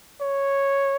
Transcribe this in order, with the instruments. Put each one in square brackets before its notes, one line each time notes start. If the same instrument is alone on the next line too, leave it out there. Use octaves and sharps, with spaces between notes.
[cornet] C#5